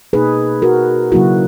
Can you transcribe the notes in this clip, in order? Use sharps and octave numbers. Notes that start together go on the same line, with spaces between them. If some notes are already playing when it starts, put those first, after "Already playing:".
B2 A#3 D#4 G#4 B4
F#4 A#4
C#3 F#3 A#3 E4 F#4